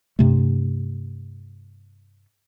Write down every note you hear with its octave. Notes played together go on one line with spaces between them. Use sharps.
G2 C3 A3